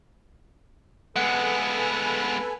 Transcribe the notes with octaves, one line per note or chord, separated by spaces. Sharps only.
G#3 B3 A4 B4 F#5 G#5 F#6